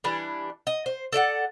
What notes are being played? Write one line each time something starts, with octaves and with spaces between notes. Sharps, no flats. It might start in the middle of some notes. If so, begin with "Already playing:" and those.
E3 G3 D4
D#5
C5
A4 D5 E5 F#5